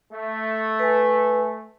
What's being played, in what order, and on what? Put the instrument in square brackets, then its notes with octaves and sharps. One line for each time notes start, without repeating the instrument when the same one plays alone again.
[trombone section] A3
[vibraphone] B4 G#5